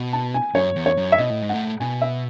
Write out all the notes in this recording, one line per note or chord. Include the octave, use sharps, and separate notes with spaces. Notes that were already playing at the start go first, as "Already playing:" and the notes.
Already playing: B2
A5
G#5
F#2 C#5
E2
C#5
F#2
E5
B2 D#5
A2
G#2
A2 F#5
B2 G#5
E5